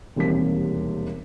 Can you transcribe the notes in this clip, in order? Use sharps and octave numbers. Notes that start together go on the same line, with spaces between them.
E1 D#2 C3 G3 B6